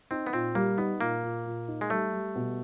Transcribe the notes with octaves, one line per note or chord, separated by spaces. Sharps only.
C4 D#4
B3
A#2 C4
G3 A#3
B3 D#4
A#2 A#3
A#2
A#2
D#4
G#3
G3 A3
G3
B2